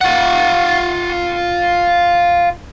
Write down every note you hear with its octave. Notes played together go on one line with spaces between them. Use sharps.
F4 F#5